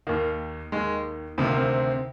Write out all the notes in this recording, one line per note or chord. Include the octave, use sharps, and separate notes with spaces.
D#2 D#3 A#3
D#2 D#3 G#3
D2 C3 D#3 C4
A#3
C4